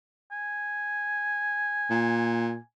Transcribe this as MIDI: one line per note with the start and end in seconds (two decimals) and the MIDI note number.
0.32 2.63 80
1.90 2.57 46